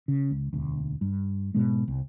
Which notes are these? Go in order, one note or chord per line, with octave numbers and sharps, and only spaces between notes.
C#3
C#2
E1 D2
G2
G#2 B2 G#3
C2